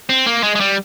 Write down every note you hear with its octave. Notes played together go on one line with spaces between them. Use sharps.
C4
A#3
G#3
G#3
G3